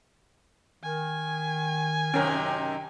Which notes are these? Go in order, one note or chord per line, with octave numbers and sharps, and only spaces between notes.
D#3 G#5
F#2 C3 D#3 C#4 A#4 G5